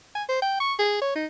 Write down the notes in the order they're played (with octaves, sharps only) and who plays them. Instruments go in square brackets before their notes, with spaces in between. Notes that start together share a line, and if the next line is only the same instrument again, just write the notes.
[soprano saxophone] G#5
C5
G5
C#6
G#4
C#5
D#4